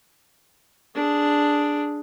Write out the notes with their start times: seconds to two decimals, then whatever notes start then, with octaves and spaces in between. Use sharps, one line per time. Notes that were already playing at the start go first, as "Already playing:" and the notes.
0.96 D4 G#4